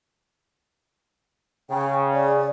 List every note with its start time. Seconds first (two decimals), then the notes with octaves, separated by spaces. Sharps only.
1.70 C#3 G5
2.14 D5